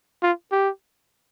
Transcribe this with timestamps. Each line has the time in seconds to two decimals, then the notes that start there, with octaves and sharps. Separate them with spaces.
0.23 F4
0.52 G4